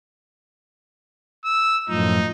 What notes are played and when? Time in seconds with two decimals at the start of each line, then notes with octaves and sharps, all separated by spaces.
1.45 E6
1.89 F#2 A2 F3 D#4